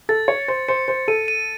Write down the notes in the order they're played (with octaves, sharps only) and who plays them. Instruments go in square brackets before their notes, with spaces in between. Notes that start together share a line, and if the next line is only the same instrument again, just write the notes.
[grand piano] A4 [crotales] A6
[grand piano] C#5 [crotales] C#7
[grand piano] C5 [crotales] A6
[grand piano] C5 [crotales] C#7
[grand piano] C5 [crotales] C#7
[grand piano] A4 [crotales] D#7
[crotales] D#7